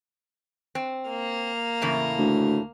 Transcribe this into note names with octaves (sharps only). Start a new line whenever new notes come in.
C4
A#3 F6
E2 A2 C#3
D2